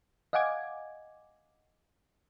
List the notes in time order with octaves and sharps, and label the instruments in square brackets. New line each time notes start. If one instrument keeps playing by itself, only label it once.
[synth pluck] D#5 F5 F#5 G#5 D6 G#6